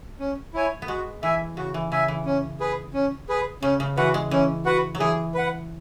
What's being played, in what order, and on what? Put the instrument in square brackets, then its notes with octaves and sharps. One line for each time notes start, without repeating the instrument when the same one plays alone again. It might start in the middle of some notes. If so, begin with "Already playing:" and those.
[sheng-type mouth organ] C#4
E4 C#5 G#5
[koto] B3
[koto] G#3 [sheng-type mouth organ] F#4
[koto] E3 [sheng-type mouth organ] E5 G#5
[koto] C#3 [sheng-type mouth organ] F#4
[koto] E3
[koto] C#3 [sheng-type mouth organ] E5 G#5
[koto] E3
[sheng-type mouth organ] C#4
G#4 B4
C#4
G#4 B4
[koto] C#3 [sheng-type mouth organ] C#4
[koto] C#3
[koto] E3 [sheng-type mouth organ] F#4 B4 F#5
[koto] G#3
[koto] E3 [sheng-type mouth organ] C#4
[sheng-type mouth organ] F#4 B4 F#5
[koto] F#3
[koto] E3 [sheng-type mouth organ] G#4
[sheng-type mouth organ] B4 F#5